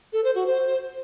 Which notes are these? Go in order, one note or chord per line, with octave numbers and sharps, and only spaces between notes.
A4
C5
F#4
C5